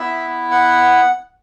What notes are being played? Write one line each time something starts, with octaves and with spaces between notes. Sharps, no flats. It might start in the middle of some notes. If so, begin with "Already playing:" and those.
Already playing: B3 E4 E5
F#5